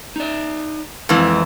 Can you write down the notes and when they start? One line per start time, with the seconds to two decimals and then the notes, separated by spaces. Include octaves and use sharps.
0.16 D#4 D5
1.09 F2 C#3 E3 G#3 C4